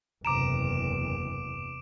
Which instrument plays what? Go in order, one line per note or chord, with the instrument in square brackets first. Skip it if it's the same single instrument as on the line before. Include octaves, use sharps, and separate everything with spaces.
[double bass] F#1 E2 [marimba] C3 A#5 [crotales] D6 D7 E7